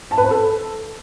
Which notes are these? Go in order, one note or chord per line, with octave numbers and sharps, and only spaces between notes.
A5
B4
C5
A4